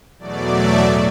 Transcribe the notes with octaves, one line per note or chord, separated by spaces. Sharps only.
E2 B2 F#3 A3 D5
E5
A2